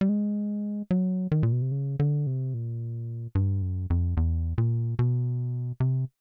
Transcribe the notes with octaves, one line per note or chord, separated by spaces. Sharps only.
G3
G#3
F#3
D#3
A#2
B2
C3
C#3
D3
C3
A#2
G2
F#2
F2
E2
A#2
B2
C3